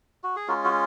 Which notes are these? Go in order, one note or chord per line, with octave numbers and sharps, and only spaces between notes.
F#4
G#4
G#3 C#4 F4 F#4 A#4
F#4